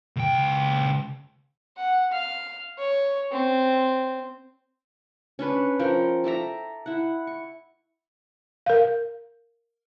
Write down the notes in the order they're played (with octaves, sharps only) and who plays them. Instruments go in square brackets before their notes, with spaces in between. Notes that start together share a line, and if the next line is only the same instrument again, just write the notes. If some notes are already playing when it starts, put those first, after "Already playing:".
[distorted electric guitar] C#2 G5
[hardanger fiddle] F#5
F5
C#5
C4
[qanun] C#4 D4 B4 C#5
F3 A#4 C#5 G5
A4 D5 E5 A#5
E4 F#5
C#6
[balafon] A#4 F5